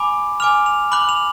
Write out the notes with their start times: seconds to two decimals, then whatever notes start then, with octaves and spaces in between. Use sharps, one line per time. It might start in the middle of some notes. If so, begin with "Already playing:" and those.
Already playing: G#5 B5 D6
0.40 G#5 D6 F6 F7
0.66 F7
0.92 B5 D6 F#6 F#7
1.09 F7